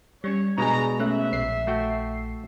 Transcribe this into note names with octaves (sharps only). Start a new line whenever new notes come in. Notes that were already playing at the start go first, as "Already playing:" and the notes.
G3 C#4 C#5
B2 G#3 D4 G#4 A#5
A3 C#4 E5 F#6
A#1 C7
A3 F#4 G5